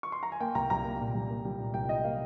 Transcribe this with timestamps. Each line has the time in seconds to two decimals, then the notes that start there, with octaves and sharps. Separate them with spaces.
0.03 C#6
0.12 C6
0.23 A#5
0.32 G#5
0.40 A#3 G5
0.55 C2 A#5
0.70 C2 A#5
0.85 A#3
1.00 A#2
1.15 G3
1.30 A#3
1.45 G3
1.59 A#2
1.74 C2 G5
1.88 G3 D#5
2.04 A#3 F5